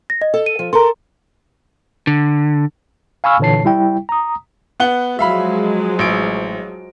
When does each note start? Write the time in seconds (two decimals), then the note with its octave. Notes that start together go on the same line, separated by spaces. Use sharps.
0.10 A#6
0.21 D#5
0.34 A4
0.46 D#7
0.59 F3
0.73 A4 A#4 A#5 C6
2.07 D3
3.24 F5 G#5 B5 C#6 E6 F6
3.40 A#2 D3 E3 C#5 A5 C7
3.65 G3 E4 G5
4.09 A#5 D#6
4.80 B3 F#5 G7
5.19 F3 F#3 G#3 E5 F5 B5
5.99 A1 D7